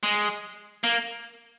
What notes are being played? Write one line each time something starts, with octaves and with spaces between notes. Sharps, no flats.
G#3
A#3